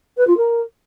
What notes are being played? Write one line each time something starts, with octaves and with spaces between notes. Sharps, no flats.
B4
F4
A#4